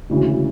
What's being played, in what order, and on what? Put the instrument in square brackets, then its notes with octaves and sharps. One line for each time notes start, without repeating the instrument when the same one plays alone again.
[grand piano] E1 D2 C#3 E3